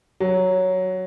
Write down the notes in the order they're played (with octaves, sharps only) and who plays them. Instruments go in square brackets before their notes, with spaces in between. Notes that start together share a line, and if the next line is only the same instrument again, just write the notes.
[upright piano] F#3